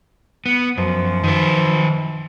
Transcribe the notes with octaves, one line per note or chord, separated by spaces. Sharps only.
B3
F#2 F3
D#3 B4